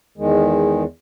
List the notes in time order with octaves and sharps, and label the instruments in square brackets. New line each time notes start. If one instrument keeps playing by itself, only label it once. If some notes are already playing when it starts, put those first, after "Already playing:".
[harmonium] E2 D#3 G#3